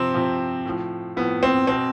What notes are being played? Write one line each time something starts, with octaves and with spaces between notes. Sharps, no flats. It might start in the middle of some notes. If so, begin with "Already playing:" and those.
Already playing: C3 F3 C4
C3 F3
A2 F3
A2 F3 B3
C4
B2 C4